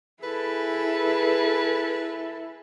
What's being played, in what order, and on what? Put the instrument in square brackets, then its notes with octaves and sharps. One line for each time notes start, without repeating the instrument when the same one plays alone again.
[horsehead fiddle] E4 A4 [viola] G#4 [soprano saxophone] B4